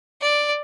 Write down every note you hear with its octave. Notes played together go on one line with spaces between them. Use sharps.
D5